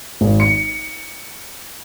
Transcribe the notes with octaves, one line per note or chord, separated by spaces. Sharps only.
G#1
C#7